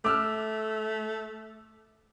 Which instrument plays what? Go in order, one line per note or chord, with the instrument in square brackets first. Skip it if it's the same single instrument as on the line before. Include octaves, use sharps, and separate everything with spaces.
[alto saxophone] A3 [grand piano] D6 E6 F6